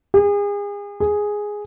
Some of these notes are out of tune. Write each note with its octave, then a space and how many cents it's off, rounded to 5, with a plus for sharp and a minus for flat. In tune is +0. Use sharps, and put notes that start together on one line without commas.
G#4 -35
G#4 +0